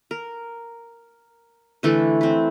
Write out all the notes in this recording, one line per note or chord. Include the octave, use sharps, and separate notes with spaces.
A#4
D3 E3 A3 A4
C4 B4